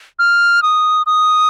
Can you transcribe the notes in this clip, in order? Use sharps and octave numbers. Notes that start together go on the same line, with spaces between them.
F6
D#6
D#6